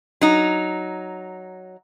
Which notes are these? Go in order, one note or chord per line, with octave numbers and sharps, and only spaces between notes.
F#3 D#4